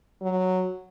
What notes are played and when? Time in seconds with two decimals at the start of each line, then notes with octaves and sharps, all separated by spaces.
0.22 F#3